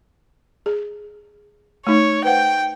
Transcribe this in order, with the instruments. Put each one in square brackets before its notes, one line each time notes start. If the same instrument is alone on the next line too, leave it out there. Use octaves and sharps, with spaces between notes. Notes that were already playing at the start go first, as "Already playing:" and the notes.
[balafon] G#4
[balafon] A3 D#4 [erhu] C#5
[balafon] B4 C5 F#5 [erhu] G5